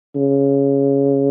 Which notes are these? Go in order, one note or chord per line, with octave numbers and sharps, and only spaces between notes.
C#3